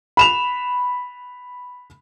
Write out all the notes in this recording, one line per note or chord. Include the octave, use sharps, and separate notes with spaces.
B5 E7 F7